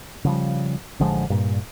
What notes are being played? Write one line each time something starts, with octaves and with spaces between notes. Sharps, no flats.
C#3 F3 G3
A1 D3 F3 G#3
G2 A#2